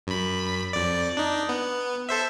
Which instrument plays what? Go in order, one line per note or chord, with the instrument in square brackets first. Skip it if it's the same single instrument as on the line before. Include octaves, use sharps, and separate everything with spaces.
[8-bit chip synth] F#2 B5
F2 D5
D4 D#4
B3
A4 C5 E5